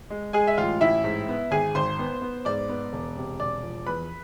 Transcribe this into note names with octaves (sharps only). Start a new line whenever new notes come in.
G#3
G#3 G#4 G#5
E5
A1 F4 F5
A1 E4 E5
G#2
B3
G#1 G#4 G#5
G#1 C5 C6
B3
B3
G#2 D5 D6
B3
E1
C3
E1 D5 D6
F3
E2 B4 B5